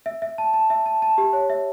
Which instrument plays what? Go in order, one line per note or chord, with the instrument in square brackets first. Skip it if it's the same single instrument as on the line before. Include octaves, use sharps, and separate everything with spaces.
[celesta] E5
E5
A5
A5
E5
A5
A5
G4
C#5
E5